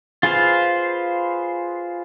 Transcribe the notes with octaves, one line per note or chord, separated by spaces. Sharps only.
F4 G#4 B4 C5 F5